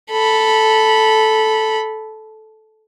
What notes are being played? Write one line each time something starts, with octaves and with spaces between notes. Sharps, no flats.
A4 B5